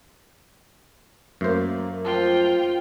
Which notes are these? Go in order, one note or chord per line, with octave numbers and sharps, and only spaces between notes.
F#2 A3 A#3 C5
F3 F4 G5